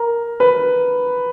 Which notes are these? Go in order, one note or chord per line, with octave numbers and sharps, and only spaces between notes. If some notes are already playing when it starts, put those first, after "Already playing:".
Already playing: A#4
B4